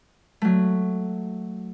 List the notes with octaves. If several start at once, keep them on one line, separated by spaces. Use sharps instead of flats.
F#3 A3